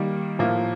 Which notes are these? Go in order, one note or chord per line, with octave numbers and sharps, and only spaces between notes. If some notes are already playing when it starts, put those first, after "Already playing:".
Already playing: D#3 G3 A#3
A2 F3 A#3